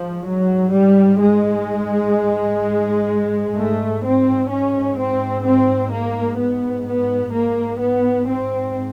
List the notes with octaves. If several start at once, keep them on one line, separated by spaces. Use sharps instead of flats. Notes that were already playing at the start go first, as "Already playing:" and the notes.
Already playing: G#2 F3
F#3
G3
G#3
G#2 A3
C4
C#4
C4
C4
A#3
B3
B3
G#2 A#3
B3
C4